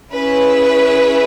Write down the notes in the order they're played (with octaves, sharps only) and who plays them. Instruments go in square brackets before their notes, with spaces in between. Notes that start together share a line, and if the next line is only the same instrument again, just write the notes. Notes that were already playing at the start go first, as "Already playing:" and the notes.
[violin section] C#4 E4 G#4 B4